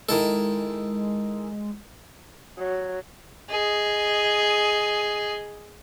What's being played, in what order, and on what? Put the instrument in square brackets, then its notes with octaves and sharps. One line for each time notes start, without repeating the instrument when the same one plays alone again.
[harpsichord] D#3 E4 A4 [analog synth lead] G#3
[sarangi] F#3
[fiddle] G#4 D#5